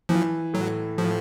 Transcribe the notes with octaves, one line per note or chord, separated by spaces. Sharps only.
E3 F3
A2 F#3
A2 F3